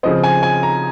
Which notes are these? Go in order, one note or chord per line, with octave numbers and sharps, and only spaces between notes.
C#3 F3 C4 D#5
G#5
G#5
A#5